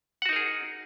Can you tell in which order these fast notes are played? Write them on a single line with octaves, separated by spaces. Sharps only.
F#5 F#4 D#4 A#4 G#4